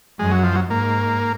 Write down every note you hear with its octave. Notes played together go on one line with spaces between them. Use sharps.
F#2 G#3
F#3
F3
F#3
G#2 A#3